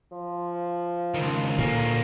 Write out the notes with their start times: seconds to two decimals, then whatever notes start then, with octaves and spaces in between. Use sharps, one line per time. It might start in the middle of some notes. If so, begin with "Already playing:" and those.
0.13 F3
1.15 C#2 D#3
1.59 A#2 D3 A#3 C#4